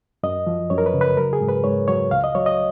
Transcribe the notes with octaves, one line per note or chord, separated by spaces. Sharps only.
F#2 D#5
F3
F#2 C#5
A#4
B4
C#3
B4
F#3 A#4
G#4
G#2
B4
G#2 C#5
F#3 C#5
C#2 F5
D#5
F#3 C#5
D#5